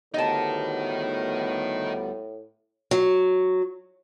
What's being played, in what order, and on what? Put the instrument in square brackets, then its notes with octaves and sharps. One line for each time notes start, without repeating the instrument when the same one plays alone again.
[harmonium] D2 G3 B3 [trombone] A2 [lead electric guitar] D#4 A#4 [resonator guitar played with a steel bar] D#5 A5
[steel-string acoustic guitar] F#3